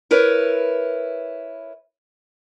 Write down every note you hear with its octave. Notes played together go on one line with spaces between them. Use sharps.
E4 A#4 B4 C#5